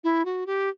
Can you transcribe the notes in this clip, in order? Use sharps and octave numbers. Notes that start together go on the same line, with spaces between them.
E4
F#4
G4